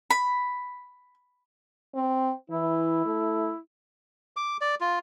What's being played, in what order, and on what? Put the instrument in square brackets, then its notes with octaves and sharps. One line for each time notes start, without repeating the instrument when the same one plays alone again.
[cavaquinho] B5
[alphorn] C4
[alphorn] E3 [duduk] E4
[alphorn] A3
[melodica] D6
D5
F4